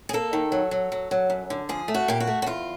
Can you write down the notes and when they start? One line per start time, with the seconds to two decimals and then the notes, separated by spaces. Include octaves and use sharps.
0.09 G#4
0.13 A#3 A4
0.33 D#3
0.52 F#3
0.71 F#3
0.92 F#3
1.11 F#3
1.30 F#2
1.50 D3
1.69 F3 G#4
1.88 A3
1.94 F#4
2.08 A#2 G4
2.20 F#4
2.27 A3
2.42 F#4
2.46 E2 F4